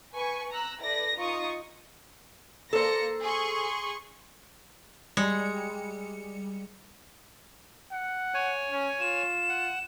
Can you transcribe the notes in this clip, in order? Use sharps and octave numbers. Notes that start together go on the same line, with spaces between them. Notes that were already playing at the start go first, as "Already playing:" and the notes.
B4 G#5 C#6
A#5 E6 F#6
E4 A4 B4 D5 A#6
D#4 F4 D#5 C#6 D#6
A#3 A4 C5 A#6 C#7
G#4 C6 C#6
G3 G#3 C#7
F#5
C#5 G#5
C#4
F4 E7
F#5